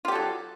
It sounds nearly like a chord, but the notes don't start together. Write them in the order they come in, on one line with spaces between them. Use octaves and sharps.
F4 G4 A4 F#3